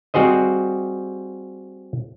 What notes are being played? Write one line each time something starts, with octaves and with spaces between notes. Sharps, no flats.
G3 C4 F#4 G#4 C5 D#5